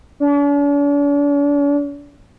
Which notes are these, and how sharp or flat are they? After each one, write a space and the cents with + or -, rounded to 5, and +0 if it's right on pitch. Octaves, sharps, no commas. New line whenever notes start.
D4 -45